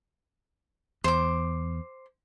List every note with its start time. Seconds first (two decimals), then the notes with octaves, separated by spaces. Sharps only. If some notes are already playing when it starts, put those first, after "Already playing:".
1.04 E2 C5 D6